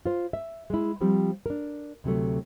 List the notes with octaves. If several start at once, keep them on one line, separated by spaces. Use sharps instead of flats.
F4 C5
E5
G#3 E4
F3 G3 C4
D4 A#4
D2 C3 F#3 A3